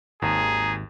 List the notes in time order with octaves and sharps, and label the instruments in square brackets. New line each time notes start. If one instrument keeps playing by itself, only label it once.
[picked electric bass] G#1 [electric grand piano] D#2 [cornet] G#4 [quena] A#5